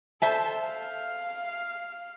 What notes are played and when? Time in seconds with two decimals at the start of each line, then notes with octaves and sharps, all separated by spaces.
0.22 A4 C5 E5 A5
0.66 F5